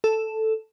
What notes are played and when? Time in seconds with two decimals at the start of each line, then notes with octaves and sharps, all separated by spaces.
0.04 A4